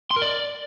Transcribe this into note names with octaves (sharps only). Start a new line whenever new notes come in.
C6
A#4
D5